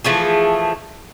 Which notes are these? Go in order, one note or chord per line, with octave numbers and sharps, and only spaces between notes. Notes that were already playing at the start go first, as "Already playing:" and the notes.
E3 F3 A3 G#4